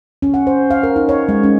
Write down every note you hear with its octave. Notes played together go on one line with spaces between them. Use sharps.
C#4
F#5
C5
F5
A#4
D#4
C#5
G#3
C#4